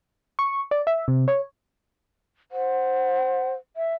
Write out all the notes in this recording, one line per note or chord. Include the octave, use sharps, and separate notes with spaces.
C#6
D5
E5
C3
C#5
C5 F#5
E5